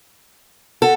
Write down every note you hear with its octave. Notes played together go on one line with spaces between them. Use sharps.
A4 F#5